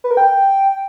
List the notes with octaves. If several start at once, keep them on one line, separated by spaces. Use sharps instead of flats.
B4
A#4
G5